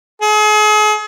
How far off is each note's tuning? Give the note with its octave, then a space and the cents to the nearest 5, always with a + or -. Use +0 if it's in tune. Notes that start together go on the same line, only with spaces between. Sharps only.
G#4 +40